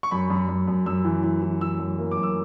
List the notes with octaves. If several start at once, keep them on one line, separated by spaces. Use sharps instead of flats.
C#6
F#2 B5
F#2
F#2
F#2
F#2 E6
E3
E3
E3
E3 E6
F#2
A#3
D6
F#2
E6